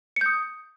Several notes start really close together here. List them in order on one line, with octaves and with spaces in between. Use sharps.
C#7 G6 D#6